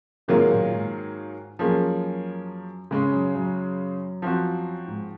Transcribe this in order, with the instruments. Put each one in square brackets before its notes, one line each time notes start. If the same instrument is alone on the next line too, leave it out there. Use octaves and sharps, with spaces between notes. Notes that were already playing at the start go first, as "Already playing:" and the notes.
[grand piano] G#2 C3 [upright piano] D#3 F#3 A#3 F4 G#4
[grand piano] F#2 A#2
G#2
[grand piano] F#2 [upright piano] F3 A#3 C#4 G#4
[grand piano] G#2 [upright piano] C#3 G#3 C#4
[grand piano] F#2
F#2
[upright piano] F3 C4 F#4
[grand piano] G#2